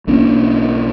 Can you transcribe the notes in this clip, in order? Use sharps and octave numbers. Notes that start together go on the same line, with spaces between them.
B1 A#3 C#4 D4